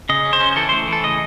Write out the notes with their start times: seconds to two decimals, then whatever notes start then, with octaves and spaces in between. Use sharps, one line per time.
0.09 C#3 D#5
0.25 C#4
0.33 C5
0.41 C#4
0.56 E3 A4
0.69 A3 C5
0.88 E3 A4
1.04 C#3 D#5